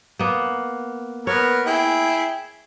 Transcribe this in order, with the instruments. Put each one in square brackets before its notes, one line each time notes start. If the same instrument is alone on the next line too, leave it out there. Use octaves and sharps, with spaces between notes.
[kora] A#3 B3
[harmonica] B3 A#4 [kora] C#5
[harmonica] E4 G#4 G5